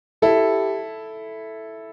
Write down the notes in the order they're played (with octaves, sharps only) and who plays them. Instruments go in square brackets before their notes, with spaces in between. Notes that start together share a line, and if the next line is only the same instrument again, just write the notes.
[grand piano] E4 A4 [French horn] G4